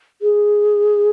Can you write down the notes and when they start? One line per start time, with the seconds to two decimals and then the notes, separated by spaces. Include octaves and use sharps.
0.22 G#4